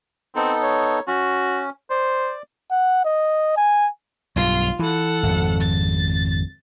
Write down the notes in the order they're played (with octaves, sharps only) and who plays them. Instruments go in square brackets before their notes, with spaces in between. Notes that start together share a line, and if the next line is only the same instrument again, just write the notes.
[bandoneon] B3 D#4 A4 [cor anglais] C4
[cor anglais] C#5
[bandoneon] C#4 [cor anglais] F#4
[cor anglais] C5 [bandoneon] D5
[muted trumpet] F#5
D#5
G#5
[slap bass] B1 G2 [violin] F4
[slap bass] E3 [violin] A4 F#5
[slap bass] G#1 F2
[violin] A6